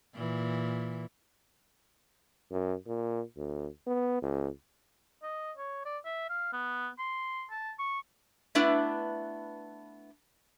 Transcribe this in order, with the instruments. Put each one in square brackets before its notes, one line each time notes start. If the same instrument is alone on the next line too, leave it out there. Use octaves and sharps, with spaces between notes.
[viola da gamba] A#2 E3
[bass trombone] F#2
A#2
D2
B3
C#2
[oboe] D#5
C#5
D5
E5
F5
B3
C6
A5
C#6
[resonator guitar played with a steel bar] A3 B3 D4 E4 B4